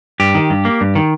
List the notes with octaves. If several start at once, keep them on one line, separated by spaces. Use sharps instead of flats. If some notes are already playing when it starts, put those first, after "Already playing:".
G2 G4
D#3
G2
A#3
G2
D#3